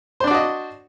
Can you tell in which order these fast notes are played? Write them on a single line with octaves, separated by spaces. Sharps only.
C5 D4 D5 F#4 D#5